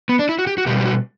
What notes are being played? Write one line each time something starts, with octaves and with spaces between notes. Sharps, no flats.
B3
D4
E4
F#4
G4
F#4
B2 G3 G4
G4
F#4